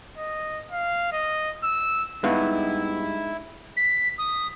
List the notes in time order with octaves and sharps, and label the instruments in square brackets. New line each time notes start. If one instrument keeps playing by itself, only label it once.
[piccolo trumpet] D#5
F5
D#5
E6
[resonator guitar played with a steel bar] G2 [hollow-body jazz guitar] G#3 D#4 [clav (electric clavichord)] B3 [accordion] E4
[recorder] B6
D#6